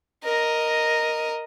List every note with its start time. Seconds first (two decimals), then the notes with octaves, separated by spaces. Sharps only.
0.24 A#4 D#5